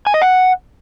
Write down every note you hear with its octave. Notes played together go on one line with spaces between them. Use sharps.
G#5
D#5
F#5